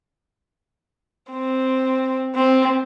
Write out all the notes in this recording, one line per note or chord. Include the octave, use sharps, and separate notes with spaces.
C4
C4